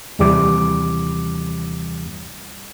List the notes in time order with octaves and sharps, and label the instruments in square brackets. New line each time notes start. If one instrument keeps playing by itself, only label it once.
[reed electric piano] D#2 C3 E3 G3 D6